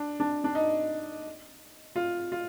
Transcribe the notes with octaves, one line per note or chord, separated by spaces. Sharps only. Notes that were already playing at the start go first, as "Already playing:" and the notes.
Already playing: D4
D4
D4
D#4
F4
F4